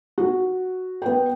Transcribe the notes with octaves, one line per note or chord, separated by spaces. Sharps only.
F#4
B3 G5